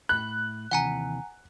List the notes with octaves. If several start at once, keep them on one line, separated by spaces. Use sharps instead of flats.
A2 B5 F#6
D#2 C3 E3 F#5 G#5 A#5